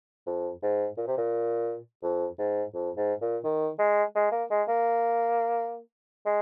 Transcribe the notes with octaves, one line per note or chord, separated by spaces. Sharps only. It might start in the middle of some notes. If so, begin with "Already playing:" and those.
F2
G#2
A#2
C3
A#2
F2
G#2
F2
G#2
A#2
D#3
G#3
G#3
A#3
G#3
A#3
G#3